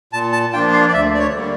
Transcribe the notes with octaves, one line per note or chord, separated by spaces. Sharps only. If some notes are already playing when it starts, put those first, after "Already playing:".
A#2 A5
A5
F3 A#3 D4 F4 G5
F5
D5
D2 E5
D5
C#5
D3 G3 A#3